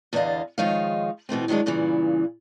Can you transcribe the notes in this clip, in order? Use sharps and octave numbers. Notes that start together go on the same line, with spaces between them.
E2 D3 B3 D5 D#5 F5
D#3 F3 G#3 D#4 C#5 F5
B2 E3 A3 C4
D#3 E3 F#3 G#3 D4
G2 A#2 C#3 E3